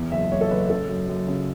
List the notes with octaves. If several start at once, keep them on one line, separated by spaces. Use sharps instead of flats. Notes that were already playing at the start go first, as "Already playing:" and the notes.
Already playing: E2
F#1 E5
F#1 C#5
A4
F#1 B4
C#3 A4
F#2
F#2
C#3